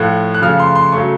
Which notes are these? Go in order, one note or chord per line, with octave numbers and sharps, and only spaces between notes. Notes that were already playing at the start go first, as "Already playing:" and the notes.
Already playing: A2 F3 A3 F#6
F#6
C#3 F3 A3 F6
C6
C6
C#3 F#3 A3 C#6